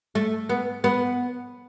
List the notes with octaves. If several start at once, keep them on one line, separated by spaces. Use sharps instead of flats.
A3
B3
B3